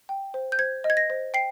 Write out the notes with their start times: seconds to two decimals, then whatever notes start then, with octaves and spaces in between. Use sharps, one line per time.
0.09 G5
0.34 C5
0.52 G6
0.59 C5 G#6
0.84 D#5
0.90 G#6
0.97 A#6
1.10 C5
1.34 G5 C7